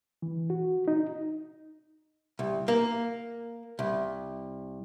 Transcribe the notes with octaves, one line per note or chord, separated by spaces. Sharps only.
E3
F#4
D#4
C2
A#3
C2